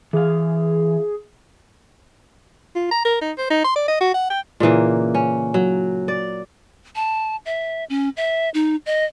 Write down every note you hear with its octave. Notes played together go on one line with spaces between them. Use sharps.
E3 G#4 F5
F4
A#5
A#4
D#4
C5
D#4
C6
D5
D#5
F#4
F#5
G5
A#2 C#3 E3 A#3
C#4
F#3
D5
A5
E5
C#4
E5
D#4
D#5